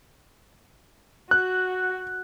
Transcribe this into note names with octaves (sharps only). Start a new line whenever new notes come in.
F#4 F#6